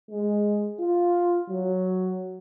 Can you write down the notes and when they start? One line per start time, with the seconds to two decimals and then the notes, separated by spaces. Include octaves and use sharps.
0.10 G#3
0.80 F4
1.50 F#3